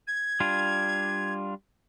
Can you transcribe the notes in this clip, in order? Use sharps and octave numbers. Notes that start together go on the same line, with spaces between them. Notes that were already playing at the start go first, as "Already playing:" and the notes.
G#6
G3 D4 F4